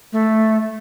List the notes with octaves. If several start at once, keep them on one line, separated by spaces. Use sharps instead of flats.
A3